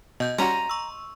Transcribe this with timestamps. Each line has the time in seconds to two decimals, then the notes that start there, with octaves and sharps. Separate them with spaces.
0.20 B2 D#5 G6
0.38 G3 C#4 F#4 A#5 C6 D#7 F7
0.69 C#6 E6